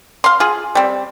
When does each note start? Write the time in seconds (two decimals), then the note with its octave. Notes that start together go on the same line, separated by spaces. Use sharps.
0.24 F5 C6
0.40 F4 G#4
0.75 G3 C4